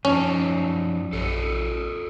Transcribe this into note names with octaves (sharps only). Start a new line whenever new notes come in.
F#2 F3 C#4 D#4 A5
A#1 A4 C5 C#5